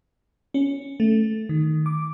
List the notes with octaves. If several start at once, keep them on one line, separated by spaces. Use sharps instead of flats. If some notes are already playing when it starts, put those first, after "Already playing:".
C#4
A3
D#3
D6